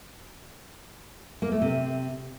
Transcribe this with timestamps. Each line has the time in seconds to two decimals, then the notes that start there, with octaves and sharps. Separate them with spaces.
1.42 A#3
1.52 A3
1.62 C3